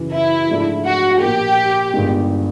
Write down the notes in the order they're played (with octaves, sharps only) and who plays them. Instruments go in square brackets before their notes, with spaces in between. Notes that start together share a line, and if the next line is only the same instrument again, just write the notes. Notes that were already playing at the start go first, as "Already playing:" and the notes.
Already playing: [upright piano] F#2 C#3 E3
[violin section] E4
[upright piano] G#2 F3 A3 D4 F4
[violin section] F#4
[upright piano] A#2 F3 A#3 [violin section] G4
[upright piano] G1 G2 D#3 G#3